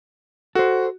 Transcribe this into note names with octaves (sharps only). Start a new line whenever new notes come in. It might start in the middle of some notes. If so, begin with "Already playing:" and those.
F#4 A4 C5